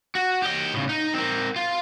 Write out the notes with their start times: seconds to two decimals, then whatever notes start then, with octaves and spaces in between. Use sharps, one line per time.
0.15 F#4
0.42 G4 D#5
0.74 A2 C#3
0.89 D#4
1.14 C4 A#4
1.56 F4